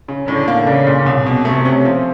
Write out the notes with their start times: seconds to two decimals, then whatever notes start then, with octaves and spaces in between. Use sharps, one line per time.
0.08 C#3
0.28 A2 D3
0.48 A#3
0.67 C#3 D4
0.87 A#2
1.06 C2
1.26 B2
1.45 C3 A3
1.65 C#4
1.85 F3